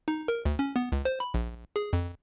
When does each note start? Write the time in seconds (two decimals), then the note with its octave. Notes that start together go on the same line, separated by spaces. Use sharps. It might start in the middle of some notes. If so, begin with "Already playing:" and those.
0.08 D#4
0.28 A#4
0.45 D2
0.59 C#4
0.76 B3
0.92 C#2
1.05 C5
1.20 B5
1.34 A#1
1.76 G#4
1.93 F2